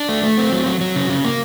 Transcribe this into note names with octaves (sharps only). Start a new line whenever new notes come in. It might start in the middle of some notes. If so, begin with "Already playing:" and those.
Already playing: D4
A3
A3
C4
F#3
F#3
F#3
C#3
C#3
A#3